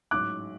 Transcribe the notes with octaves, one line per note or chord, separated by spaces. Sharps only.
A1 G#2 F#3 D6 F#6